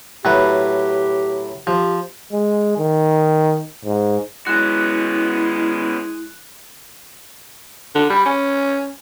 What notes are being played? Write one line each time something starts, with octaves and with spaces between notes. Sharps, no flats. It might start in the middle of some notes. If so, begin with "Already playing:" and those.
A2 F#3 G4 B4
F3 G4
G#3
D#3
G#2
G#3 B3 C#4 E4 F#4 F#6 E7
D3
G3 B5
C#4 G#5